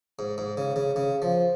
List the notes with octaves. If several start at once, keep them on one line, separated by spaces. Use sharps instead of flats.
G#2
G#2
C#3
C#3
C#3
F3